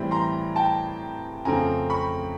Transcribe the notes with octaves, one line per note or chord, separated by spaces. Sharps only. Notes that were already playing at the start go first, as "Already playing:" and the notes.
Already playing: A2 E3 G3 C4 B5
A#5 C6
G5 A5
F2 C#3 F3 A3 C4 G#5 A#5
B5 C#6